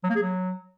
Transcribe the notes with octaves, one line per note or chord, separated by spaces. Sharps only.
F#3
A#3
G#4
F#3